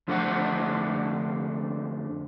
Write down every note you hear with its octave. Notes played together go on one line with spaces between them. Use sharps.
F2 D3 A3 D4 C5 F#5